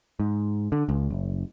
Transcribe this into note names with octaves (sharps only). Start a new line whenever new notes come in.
G#2
D3
C#2
F#1